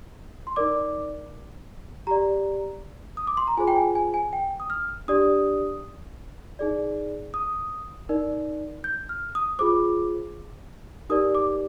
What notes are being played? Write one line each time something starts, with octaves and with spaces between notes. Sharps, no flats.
C6
D#4 A#4 D5 D6
G4 D5 A#5
D#6
D6
C6
A#5
F4 G#4 C5 G#5
G5
G#5
G#5
G#5
G5
D#6
F6
D4 G4 D5 D#6
D#4 G#4 D5
D#6
D#4 A#4 D5
G6
F6
D#6
F4 G#4 C5 D6
D#4 G4 A#4 D5 D#6
D6